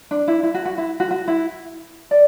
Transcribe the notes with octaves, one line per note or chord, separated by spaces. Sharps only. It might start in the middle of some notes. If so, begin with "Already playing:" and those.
D4
E4
E4
F#4
F#4
E4
F#4
F#4
E4
D5